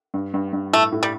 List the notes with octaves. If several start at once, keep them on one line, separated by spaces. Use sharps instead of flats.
G2
G2
G2
A2 A3
A2
G3